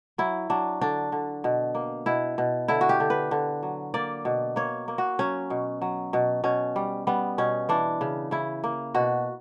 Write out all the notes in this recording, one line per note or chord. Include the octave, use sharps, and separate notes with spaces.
F#3 E4
F#3 D4
D3 D4
D3
B2
A#3
B2 E4
B2
D3 E4
F#4
G4
D3
B4
D3
F#3
A#3 D5
B2
A#3 C#5
A#3
F#4
F#3 C#4
B2
F#3
B2
B2 C#4
G3
G3 B3
B2 C#4
E3 D4
C#3
C#3 E4
A#3
B2 F#4